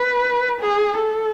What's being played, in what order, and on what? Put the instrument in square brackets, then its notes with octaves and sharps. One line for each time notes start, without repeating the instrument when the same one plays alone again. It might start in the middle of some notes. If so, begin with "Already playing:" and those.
Already playing: [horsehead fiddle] B4
G#4
A4